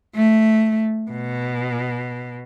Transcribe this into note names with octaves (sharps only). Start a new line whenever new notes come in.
A3
B2